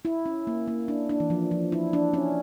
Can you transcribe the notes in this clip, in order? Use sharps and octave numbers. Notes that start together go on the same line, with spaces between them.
E4
C#4
A#3
A#3
D4
D4
E3
F3
F3
E4
D4
C#4